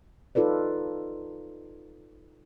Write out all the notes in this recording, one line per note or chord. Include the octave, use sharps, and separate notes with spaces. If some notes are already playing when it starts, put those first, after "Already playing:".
D#4 F4 A4 B4 D5